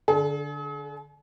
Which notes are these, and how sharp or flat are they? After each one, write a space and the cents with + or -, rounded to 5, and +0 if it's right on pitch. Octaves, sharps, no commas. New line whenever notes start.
D3 -5 G#4 +45